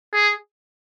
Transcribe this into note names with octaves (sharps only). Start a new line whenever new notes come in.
G#4